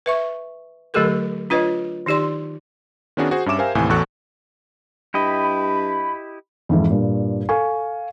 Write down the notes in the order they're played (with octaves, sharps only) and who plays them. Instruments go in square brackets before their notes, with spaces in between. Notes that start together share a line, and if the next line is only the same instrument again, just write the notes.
[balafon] B4 E5 C#6
D3 F#3 A3 G4 A4 A#4
D4 F4 B4 C#5 D#5
D#3 D#4 G4 D5 C6
[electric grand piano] D#3 B3 C#4 D4 F#4 G#4
F#4 G#4 C5
G2 C#4 E5 D6 E7
G4 A#4 C5 E5 F5 G#5
D#2 A2 C3 E3 G#5
A1 E2 F#4 A4 C#6 F#6
[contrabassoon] G2 [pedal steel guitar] E4 G4 D#5 [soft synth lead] B5
[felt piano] F2 G#2 E3
G2 A#2
A4 F5 G#5 C#6